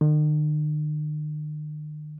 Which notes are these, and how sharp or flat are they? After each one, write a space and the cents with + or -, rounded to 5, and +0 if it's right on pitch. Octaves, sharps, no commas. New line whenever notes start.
D#3 -45